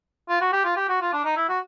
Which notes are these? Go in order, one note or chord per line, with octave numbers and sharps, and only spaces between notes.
F4
F#4
G4
F4
G4
F#4
F4
D4
D#4
E4
F#4